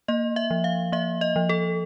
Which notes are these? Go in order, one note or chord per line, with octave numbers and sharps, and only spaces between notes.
A#3 D#5
E5
F3
F5
A#3 E5
D#5
F3
A4